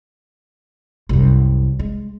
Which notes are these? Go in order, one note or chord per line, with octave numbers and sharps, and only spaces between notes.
C2 F#2
G#3